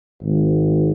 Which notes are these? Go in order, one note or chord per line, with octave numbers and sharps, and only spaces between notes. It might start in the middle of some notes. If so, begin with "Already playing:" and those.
G#1